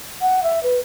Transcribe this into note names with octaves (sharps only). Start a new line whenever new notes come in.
F#5
E5
B4